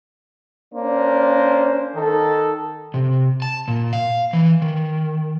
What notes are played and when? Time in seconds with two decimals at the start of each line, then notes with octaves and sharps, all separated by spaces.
0.73 A#3 C#4 D4 C5
1.95 D#3 A4
2.94 C3
3.42 A5
3.68 A#2
3.93 F5
4.33 E3
4.62 D#3